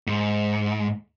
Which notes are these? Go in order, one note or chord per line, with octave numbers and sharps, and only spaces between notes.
G#2